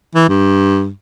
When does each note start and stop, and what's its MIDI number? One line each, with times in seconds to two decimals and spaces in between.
0.15 0.28 52
0.29 0.89 43